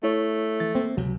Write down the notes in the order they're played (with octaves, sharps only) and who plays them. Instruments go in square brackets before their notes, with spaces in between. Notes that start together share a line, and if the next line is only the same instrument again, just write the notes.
[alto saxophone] A3 [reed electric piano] E4 C#5
[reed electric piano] E3 A6
[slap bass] A#3 [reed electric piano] C4
[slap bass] C#2 C3 [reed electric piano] F#3